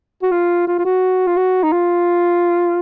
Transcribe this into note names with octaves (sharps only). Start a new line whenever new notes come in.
F#4
F4
F4
F4
F#4
F4
F#4
D#4
F4